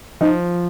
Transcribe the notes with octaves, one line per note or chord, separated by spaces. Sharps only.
F3 D#4